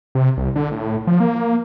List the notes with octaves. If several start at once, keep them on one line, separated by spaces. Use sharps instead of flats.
C3
C2
D3
A2
F3
A#3